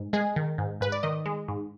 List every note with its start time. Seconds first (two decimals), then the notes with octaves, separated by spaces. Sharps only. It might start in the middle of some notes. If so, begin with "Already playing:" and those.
Already playing: G#2
0.13 G#3 G#4
0.36 D#3
0.58 G#2
0.81 G#2 B4
0.92 D5
1.03 D#3 D#5
1.26 G#3
1.48 G#2